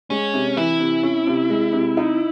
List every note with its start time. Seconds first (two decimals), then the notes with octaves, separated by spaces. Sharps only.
0.10 G#3 C#4
0.34 C3
0.57 E3 E4
0.80 C3
1.03 C#4
1.27 C3
1.50 G#3
1.73 C3
1.97 D#4